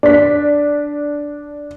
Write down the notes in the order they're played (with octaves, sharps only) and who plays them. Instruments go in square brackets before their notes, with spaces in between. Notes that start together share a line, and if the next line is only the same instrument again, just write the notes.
[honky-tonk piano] D4 B6